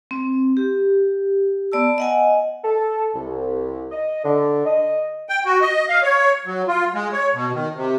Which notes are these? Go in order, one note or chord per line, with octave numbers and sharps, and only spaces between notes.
C4
G4
B3 D5 A5 E6
D#5 F#5 G#5
A4
C2
D#5
D3
D#5
G5
F#4
D#5
F5
C#5
F#3
F4
G#3
C#5
B2
D#3
C3